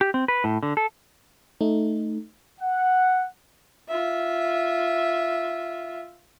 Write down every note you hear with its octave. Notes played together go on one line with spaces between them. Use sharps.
G4
C4
B4
A2
D3
A4
A3 D#4
F#5
F4 E5